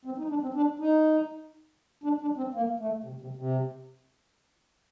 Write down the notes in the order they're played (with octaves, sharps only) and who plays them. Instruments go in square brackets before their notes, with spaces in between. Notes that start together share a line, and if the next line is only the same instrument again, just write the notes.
[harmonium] C4
D#4
D4
C4
D4
D#4
D4
D4
C4
A#3
A3
C3
C3
C3